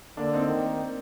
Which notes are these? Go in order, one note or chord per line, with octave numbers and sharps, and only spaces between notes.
D3 A#3 D4
C4 D#4
D#3